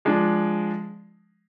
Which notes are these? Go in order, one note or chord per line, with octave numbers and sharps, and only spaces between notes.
F3 G#3 D4